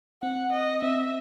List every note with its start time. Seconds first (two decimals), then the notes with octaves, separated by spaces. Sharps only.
0.22 C4 F#5
0.52 D#5
0.82 C4 E5